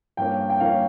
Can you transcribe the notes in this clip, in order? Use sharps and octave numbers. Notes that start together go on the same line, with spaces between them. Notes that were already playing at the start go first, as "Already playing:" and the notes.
G2 F3 A#3 C#4 G5
G5
G2 F3 A#3 C#4 F5